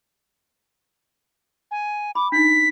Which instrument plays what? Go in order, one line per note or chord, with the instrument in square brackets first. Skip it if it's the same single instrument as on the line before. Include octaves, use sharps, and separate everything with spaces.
[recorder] G#5
[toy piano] B5 [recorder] D6
[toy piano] D4 D#4 [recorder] B6